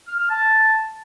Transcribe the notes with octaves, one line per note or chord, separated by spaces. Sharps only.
F6
F6
A5